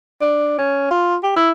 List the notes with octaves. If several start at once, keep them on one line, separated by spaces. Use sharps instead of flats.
D4
C#4
F4
G4
E4